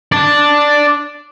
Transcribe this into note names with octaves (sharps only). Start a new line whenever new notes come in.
D5 A5